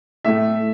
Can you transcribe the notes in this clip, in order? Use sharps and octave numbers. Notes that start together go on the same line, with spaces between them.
A2 A3 E5